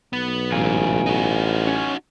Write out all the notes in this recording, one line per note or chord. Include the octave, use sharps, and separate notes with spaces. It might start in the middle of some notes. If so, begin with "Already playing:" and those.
B1 B3
A1 E2 G#2 F5 G#5
D#4 F#4
C#4